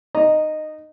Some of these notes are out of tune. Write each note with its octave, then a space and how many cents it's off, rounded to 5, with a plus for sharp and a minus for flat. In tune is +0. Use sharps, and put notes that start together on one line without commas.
D#4 -20 D#5 -10 A#5 +0